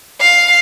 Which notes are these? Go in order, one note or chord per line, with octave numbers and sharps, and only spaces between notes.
F5